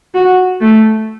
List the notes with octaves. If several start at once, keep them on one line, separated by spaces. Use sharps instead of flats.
F#4
A3